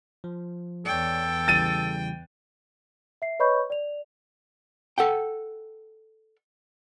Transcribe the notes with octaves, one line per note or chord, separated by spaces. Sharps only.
F3
E2 A4 C#5 D5 G5
C#3 E3 G3 A6 D#7
E5 C7
B4 C#5 D#5 B5 C#6 G6
D5 F7
A4 F#5 G5